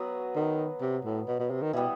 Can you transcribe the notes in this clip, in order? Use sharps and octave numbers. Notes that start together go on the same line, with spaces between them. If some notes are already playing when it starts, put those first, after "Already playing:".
Already playing: F#3 B3 F#4 B4
D#3
C3
A2
B2
B2
C3
D#3
B2 E3 G3 B3